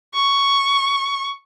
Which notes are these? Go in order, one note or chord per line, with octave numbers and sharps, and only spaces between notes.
C#6